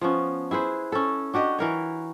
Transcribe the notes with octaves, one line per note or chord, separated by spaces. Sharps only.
F3 B3 C#4
E4 G#4 B4 C5
C#4 A4
D4 F#4 G4 D#5
E3 A#4 C#5